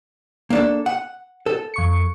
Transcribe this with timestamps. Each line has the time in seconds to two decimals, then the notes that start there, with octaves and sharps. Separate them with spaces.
0.50 A#3 D4 A4
0.86 F#5
1.46 A4
1.74 F2 C#6 C#7